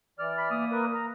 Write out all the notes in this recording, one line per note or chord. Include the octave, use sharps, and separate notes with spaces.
E3 D5 F6
B5
A#3 D#6
A#4 B4
A#5